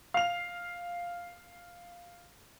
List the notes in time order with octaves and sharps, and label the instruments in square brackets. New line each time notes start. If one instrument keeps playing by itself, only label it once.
[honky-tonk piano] F5 F7